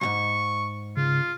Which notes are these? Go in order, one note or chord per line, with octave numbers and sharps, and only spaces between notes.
B1 G#2 C#6
C#3 F4